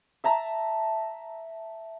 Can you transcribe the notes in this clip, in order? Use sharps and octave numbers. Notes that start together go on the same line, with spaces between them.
E5 A5 A#5